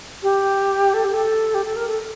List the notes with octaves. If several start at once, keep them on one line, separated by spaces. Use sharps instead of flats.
G4
A4
G4
A4
G4
A4
A#4
A4